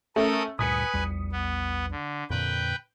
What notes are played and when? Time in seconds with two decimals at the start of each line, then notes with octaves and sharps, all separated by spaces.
0.16 A3 C#4 A4 A#4 D#6
0.59 D2 G2 A#2 B4 G#5 D#6 B6 C#7
0.93 A#1 E2 G3
1.32 B3
1.91 D3
2.30 F2 A#2 D3 B4 G5